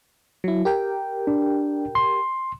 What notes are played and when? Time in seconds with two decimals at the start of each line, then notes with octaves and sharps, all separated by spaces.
0.44 F#3 E4
0.65 G4 A#4 G5
1.27 D4
1.95 C6